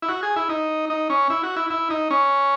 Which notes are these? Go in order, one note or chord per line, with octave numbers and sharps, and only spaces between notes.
E4
F#4
G#4
E4
D#4
D#4
C#4
E4
F#4
E4
E4
D#4
C#4